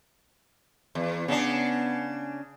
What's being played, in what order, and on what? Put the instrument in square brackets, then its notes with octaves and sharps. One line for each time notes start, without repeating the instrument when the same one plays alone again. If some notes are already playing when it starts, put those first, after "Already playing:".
[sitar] E2
[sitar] C#3 D4 [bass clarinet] B3